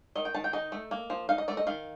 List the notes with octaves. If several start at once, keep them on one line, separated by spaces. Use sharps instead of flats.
D#3 D#5
G5
D#3 A5
G5
D#4 D#5
A3
A#3
F3
D#4 F5
D#5
A3 D5
D#5
D#3 F5